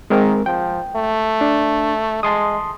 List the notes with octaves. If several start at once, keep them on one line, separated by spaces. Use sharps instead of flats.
D#3 G#3 C4 A#4
F3 G5
A3
D4
G#3 A5 C6 D#6